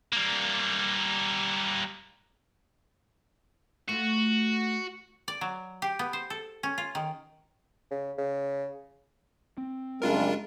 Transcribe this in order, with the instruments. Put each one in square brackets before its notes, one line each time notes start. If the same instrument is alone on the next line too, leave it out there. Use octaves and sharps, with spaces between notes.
[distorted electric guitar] G3 A#3
[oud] A3 F4 [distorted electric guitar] F#4
[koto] D5
F#3
G4
B3
C5
A4
C#4
F4
D#3
[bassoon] C#3
C#3
[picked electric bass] C4
[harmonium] F#2 C#3 G3 [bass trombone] G#3 [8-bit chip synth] D4 F4 A#4